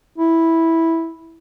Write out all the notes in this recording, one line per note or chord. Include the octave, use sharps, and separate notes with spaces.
E4